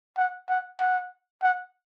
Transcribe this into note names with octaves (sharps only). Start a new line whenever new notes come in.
F#5
F#5
F#5
F#5